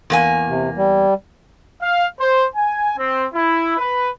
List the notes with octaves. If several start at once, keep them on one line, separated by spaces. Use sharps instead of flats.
E2 A#3 G#5
C3
G3
F5
C5
G#5
C4
E4
B4